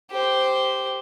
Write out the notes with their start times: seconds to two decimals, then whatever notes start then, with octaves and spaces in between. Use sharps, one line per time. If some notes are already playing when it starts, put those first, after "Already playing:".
0.11 G4 C5